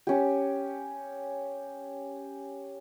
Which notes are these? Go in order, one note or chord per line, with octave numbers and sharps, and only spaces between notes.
C#4 G4